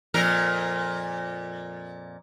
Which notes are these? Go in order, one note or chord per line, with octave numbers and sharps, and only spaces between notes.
F2 A#2 A#4